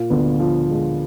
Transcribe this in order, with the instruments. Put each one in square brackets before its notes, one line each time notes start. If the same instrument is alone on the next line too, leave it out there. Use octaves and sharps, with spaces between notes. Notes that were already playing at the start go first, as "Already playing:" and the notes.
Already playing: [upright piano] A#2
[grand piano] D2 D3 [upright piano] B3
[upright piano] F3
G#3